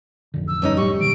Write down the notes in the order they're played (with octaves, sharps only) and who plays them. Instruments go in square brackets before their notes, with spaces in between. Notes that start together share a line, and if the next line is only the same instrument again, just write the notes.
[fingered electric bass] A1 F2 D3
[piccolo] E6
[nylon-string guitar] G2 C#4 D#4
[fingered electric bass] F1 A2 [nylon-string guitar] G3 [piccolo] C#6
[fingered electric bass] A#2 D3 F#3 [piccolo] D7